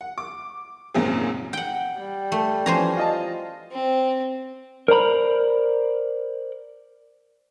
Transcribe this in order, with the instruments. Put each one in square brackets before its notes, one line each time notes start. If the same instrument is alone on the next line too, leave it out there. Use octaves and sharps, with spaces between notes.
[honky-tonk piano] F#5
D6
G#1 C#2 F#2 A#2 C4 G#4
[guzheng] F#5 G5
[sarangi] G3
[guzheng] A3
[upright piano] E3 F3 C#4 [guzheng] C5 G#5 A#5
[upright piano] F4 D#5 A5
[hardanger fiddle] C4
[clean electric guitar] A#4 C5 D5 A#5 B5